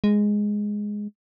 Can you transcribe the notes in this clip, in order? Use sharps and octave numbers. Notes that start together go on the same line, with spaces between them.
G#3